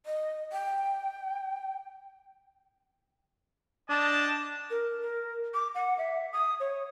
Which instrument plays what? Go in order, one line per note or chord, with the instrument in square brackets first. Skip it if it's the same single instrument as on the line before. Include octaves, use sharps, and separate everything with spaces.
[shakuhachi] D#5
G5
[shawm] D4 [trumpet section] D#5 G5 A5
[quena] A#4
A#4
D6
F#5
E5
D#6
C#5